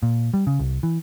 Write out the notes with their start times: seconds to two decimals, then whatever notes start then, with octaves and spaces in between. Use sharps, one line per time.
0.03 A#2
0.34 G3
0.47 C#3
0.59 C2
0.83 E3